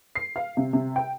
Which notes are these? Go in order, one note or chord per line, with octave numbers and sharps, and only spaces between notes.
C7
F5
C3
C3
G5